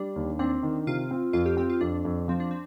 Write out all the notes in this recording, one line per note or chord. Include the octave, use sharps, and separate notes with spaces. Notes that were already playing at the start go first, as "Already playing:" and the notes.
Already playing: G3 D4
D#2
C4 D4
D#3
C3 F4
C4
F2 F4
G4
C4 G4
F4
F2 D4
F2
F3 C4
D4
C4